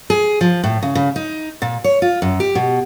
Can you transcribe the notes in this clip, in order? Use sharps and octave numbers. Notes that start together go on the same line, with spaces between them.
G#4
F3
A2
C#3
C#3
D#4
A#2
C#5
F4
F#2
G4
B2